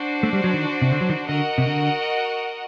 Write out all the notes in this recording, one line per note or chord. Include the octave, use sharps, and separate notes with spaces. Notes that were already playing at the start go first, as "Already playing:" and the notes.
Already playing: D4 F#4 C5
A3
G3
F#3
D#3
C3
D3
F#3
D#3
D3 F#4 A#4 D#5 F#5
C3
D3